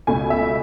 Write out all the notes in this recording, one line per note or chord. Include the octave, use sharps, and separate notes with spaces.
C#2 B2 A3 G#5
E5